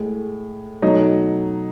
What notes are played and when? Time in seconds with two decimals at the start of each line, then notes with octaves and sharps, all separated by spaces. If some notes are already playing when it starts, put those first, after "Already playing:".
Already playing: A2 G#3
0.82 B2 F#3 A3 D#4